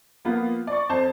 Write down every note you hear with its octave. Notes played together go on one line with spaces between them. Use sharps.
F3 A#3 B3 F4
D5 C#6
F2 C5 A5